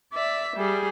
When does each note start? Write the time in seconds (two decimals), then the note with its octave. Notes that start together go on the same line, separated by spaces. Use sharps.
0.13 D5 E5
0.56 G3 G#4